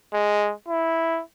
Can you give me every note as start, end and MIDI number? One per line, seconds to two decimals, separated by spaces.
0.14 0.52 56
0.69 1.21 64